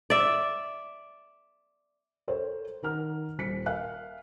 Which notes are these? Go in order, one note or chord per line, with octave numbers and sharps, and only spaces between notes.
D5 E5
A4 A#4 C5 C#5
D#3 A#4 F#5 A#5 F6
D#1 B6 C#7
A#4 E5 F5 G#5 F#6